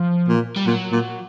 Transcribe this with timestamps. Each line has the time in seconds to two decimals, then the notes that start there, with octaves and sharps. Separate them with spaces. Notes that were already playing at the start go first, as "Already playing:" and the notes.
Already playing: F3
0.28 A#2
0.56 G3
0.66 A#2 F#3
0.92 A#2